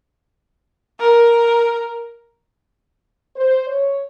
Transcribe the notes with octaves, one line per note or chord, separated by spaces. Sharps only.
A#4
C5
C#5